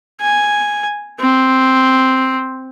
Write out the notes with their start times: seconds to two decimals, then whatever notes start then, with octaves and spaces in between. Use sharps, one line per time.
0.21 G#5
1.19 C4